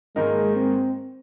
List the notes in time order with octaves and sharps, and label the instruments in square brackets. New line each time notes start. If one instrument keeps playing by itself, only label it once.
[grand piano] G#2 D#3 A#3 D#4 A#4 [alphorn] G#3
[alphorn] C4